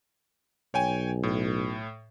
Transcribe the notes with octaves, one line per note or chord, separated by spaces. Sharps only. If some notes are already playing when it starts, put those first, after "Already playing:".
B1 C#5 G5 G#5
A2